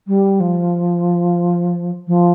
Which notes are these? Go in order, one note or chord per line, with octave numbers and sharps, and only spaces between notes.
G3
F3
F3